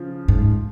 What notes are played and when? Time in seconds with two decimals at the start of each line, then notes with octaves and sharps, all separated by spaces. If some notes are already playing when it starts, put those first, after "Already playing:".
Already playing: C#3 F3
0.28 G#2